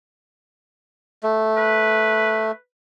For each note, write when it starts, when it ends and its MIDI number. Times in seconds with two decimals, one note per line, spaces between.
1.23 2.51 57
1.57 2.59 71